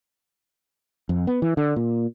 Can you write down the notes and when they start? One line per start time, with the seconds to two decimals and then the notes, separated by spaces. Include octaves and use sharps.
1.09 F2
1.27 B3
1.42 E3
1.57 D3
1.76 A#2